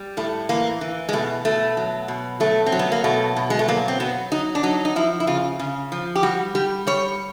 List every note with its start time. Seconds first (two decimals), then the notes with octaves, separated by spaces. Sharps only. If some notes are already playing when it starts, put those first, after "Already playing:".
Already playing: G3
0.17 A2 A3
0.49 E3 A#3
0.81 E3
1.09 G#3
1.13 B2 A3
1.45 B2 A3
1.77 F#3
2.08 B2
2.40 F#3 A3
2.66 C4
2.72 F#3
2.79 B3
2.92 A#3
3.04 B2 A3
3.36 B2
3.50 G#3
3.59 A3
3.68 F#3 A#3
3.88 C4
4.00 F#3 B3
4.32 F#3 D#4
4.55 D4
4.63 F#3 D#4
4.85 D#4
4.96 F3 E4
5.20 E4
5.27 C#3 F4
5.59 C#3
5.92 F3
6.15 G4
6.23 G3 F#4
6.55 G3 G4
6.87 G3 C#5